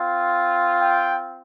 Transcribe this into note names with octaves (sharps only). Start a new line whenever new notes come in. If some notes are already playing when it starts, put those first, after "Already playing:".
Already playing: C4 F4
G5